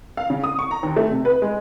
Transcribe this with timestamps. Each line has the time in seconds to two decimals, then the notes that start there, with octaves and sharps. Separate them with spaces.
0.17 F5
0.30 C#3
0.44 D#6
0.59 C#6
0.71 A#5
0.83 D#2
0.96 A3
1.10 C3
1.25 B4
1.42 G#3